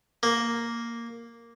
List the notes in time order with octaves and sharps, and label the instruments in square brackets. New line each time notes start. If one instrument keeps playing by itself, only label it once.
[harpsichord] A#3